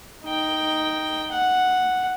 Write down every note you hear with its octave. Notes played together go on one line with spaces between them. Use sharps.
D#4 G5
F#5